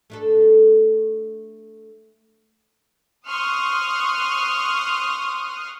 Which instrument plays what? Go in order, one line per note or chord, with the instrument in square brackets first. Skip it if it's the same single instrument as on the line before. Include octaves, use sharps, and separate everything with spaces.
[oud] A3 D4 A4
[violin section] C6 C#6 D#6 F6 F#6